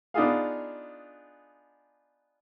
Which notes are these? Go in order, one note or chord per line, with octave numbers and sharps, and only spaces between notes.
B3 D4 D#4 F4 G#4 F5